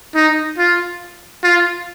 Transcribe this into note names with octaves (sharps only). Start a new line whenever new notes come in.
D#4
F4
F4